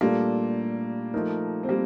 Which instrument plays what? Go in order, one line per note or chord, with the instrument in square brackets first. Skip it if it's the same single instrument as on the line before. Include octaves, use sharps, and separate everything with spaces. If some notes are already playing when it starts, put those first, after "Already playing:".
[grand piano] A#2 A3 D4 F4 A4 [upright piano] G3 A#3
[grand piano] F3 A3 D#4 A#4
[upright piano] C4
G3 A#3